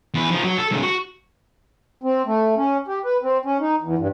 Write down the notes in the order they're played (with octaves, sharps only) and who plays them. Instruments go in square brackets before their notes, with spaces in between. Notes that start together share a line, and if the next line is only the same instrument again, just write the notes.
[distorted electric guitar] E2 B4
F3 D#4
F#3
A4
G#2 C#3
F#4
[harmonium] C4
A3
C#4
G4
B4
C4
C#4
D#4
E2
G2